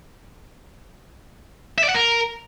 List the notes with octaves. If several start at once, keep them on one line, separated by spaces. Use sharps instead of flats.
E5
D5
F#5
A#4